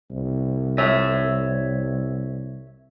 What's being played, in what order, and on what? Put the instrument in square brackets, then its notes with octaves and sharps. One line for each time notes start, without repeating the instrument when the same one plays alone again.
[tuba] C2
[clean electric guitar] C#5 E5